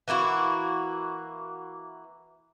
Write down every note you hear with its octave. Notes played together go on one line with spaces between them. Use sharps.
E3 A#3 E4 F#4